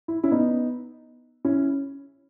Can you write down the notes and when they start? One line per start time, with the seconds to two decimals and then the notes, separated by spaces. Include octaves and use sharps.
0.08 E4
0.23 C#4 E4
0.31 B3 D#4
1.45 C#4 E4